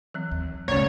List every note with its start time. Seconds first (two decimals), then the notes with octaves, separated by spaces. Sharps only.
0.14 E3 F#3 C4
0.31 D#2
0.68 G#1 C#2 A#2 C#3 G#3 A3 C#5